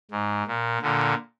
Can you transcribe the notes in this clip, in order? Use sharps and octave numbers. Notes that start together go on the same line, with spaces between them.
G#2
A#2
A#2 D3